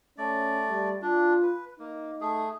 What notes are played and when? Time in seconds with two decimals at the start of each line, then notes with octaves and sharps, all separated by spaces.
0.18 A3 C#4 D5
0.69 G3
1.02 D4 F4
1.43 B4
1.80 A#3 D#4
2.21 A3 G#4